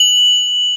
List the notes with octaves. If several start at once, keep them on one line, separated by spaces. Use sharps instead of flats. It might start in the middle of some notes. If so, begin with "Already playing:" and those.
Already playing: F#7